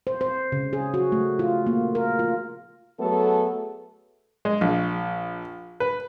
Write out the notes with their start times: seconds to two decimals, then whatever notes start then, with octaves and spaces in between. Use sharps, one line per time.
0.07 C5
0.21 C5
0.52 C#3
0.73 G#4
0.94 F#4
1.12 A3
1.39 F4
1.67 A#3
1.95 A#4
2.19 F4
3.00 F#3 A3 B3 G#4 A4
4.45 G#3
4.61 A#1
5.80 B4